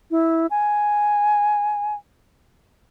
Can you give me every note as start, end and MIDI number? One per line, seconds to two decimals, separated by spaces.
0.11 0.47 64
0.51 1.95 80